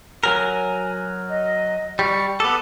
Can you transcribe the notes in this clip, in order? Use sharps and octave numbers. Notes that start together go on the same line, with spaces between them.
F#3 A#4 G#5
D#5
G3 C#6
B3 A4 D6